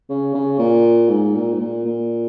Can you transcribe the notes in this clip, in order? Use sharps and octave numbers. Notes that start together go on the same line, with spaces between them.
C#3
C#3
A#2
G#2
A#2
G#2
A#2
A#2